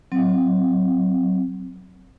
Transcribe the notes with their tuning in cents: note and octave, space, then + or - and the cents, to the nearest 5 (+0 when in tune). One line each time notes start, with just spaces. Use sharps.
F#3 +5 C4 +0